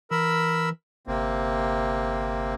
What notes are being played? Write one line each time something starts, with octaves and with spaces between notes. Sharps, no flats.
E3 A#4 B5 E6
G1 C3 A#3 C4